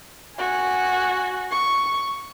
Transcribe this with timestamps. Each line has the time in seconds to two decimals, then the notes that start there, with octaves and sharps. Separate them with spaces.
0.38 F#4 G#5
1.51 C#6